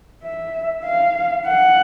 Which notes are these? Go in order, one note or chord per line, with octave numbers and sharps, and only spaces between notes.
E5
F5
F#5